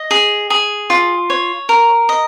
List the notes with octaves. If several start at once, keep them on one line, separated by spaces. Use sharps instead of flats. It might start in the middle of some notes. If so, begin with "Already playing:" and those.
Already playing: D#5
G#4
G#4
F4
C#5
A#4
D#5